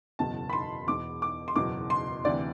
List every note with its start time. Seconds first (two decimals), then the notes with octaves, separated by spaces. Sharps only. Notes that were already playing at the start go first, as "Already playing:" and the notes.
0.19 F#1 E2 B2 F#3 A5
0.49 B5
0.53 C6
0.87 E1 E2 B2 D6
1.22 D6
1.48 C6
1.56 F#1 E2 B2 F#3 D6
1.90 C6
2.24 D2 C3 E3 D5